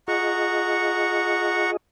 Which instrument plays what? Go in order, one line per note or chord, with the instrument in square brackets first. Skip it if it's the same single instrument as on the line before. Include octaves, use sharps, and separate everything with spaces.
[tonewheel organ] F4 G#4 D#5 [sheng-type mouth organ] F#5 A#5 C#6